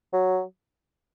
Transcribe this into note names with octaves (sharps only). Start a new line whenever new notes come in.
F#3